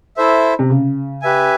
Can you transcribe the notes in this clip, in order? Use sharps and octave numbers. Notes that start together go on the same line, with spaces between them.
E4 A4 C5 E5
C3
C#3
G4 B4 E5 G#5